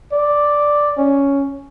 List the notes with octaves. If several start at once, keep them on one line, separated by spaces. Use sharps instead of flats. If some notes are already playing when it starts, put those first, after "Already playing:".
D5
C#4